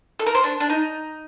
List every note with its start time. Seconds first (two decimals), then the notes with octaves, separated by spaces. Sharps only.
0.19 A4
0.27 A#4
0.35 C5
0.44 D4
0.60 D4
0.70 D#4